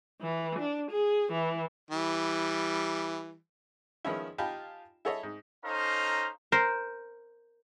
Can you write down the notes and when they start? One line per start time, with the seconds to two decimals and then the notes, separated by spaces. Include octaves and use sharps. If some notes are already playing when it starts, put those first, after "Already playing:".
0.22 E3
0.59 D4
0.91 G#4
1.32 E3
1.91 E3 G3
4.04 D#3 F3 G#3 B3 C#4 E4
4.38 D#4 F4 G4 G#5 A5 B5
5.05 E4 G#4 A4 C#5 D#5 E5
5.23 G#2
5.64 C#4 D#4 A4 C5 F5 A#5
6.52 A#4 C5